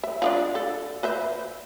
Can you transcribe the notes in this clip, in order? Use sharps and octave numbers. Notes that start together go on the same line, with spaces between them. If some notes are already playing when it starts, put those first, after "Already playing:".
E5
D4 D#4 F4
A4
B4 C5 E5